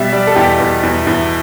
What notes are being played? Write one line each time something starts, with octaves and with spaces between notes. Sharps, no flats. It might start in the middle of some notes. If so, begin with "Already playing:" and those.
Already playing: B2 G3 E5
G3 D5
A4
E2 G4
E2
E2
E2